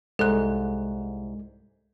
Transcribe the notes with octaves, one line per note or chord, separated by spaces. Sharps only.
C2 G#2 G#3 A4 F#6